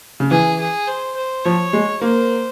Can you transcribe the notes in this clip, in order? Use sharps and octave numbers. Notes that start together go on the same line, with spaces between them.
C#3
E3 G#4
G#4
C5
C5
F3 C#5
G#3
A#3 C5